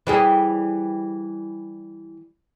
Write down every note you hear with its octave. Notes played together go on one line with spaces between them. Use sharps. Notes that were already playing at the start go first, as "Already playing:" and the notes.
E3 G3 G#4